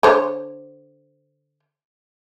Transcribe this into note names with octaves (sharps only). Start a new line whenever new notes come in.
D3 C5 C#5